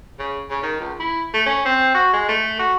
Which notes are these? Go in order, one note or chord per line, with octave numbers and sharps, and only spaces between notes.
C#3
C#3
D#3
C#2
E4
A3
C#4
C4
F#4
G#3
A3
F#4